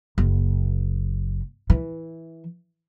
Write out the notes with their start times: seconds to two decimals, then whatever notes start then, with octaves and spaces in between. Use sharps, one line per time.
0.18 F#1
1.70 E3